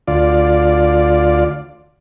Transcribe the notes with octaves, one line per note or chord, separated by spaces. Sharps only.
D2 F4 D5